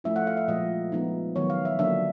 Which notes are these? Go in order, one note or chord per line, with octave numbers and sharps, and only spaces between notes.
F3 A3 C#4 E4 E5
F#5
F5
E5
A#2 F3 G#3 D#5
F3 G#3 B3 D#4
D#3 F#3 B3 C#5
F5
E5
D3 F#3 A#3 D4 E5